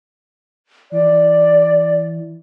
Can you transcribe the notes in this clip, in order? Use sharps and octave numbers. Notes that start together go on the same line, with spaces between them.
E3 D5